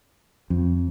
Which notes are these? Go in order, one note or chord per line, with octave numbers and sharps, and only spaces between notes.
F2